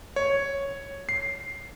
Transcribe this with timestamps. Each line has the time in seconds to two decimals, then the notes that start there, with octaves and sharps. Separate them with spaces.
0.16 C#5
1.09 C7